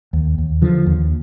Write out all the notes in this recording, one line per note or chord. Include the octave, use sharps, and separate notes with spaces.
D#2
D#2
D3 F3
D#2